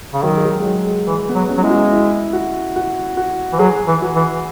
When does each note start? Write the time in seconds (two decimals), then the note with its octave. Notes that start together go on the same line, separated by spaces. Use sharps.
0.14 C#3
0.23 D#3 F#3
0.37 G#3
0.44 F#3
0.60 G#3
0.65 F#3
0.87 G#3
1.07 E3
1.29 B3
1.35 F#3
1.49 C#4
1.58 F#3
1.63 G#3 E4
1.70 F#4
1.92 E4
2.33 F#4
2.76 F#4
3.17 F#4
3.53 E3
3.59 F#3 G#4
3.87 E3
4.02 F#4
4.15 E3